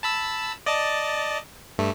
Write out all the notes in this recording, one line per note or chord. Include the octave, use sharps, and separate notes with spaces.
A5 B5 E6
D5 D#5 A5
G2 A3